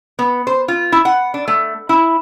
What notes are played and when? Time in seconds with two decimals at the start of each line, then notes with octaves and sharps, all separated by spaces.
0.19 B3
0.47 C5
0.68 F4
0.92 E4
1.05 F#5
1.34 D4
1.48 A3
1.89 E4